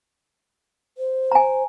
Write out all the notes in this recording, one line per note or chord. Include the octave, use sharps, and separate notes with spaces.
C5
G#5 A#5